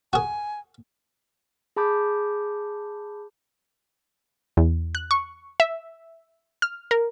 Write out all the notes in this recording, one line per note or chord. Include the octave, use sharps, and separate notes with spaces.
F#4 G#4 G#5
G#4 A5 B5 D6 G6
E2
F#6
C#6
E5
F6
A#4